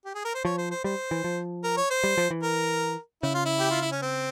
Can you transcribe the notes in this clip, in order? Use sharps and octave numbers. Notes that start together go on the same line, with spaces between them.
G4
G#4
A#4
C5
F3 C#5
C5
C5
G3 C5
E3
F3
A#4
C#5
C5
G3
F3
E3
A#4
C#3 E4
F4
E4
G4
F4
E4
C#4
C4